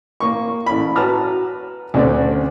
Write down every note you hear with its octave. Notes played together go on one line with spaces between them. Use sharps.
A#3 C#6
A1 B5
F#4 B4 A5 A#5 F6
D2 C3 A3 C4 C#4 D5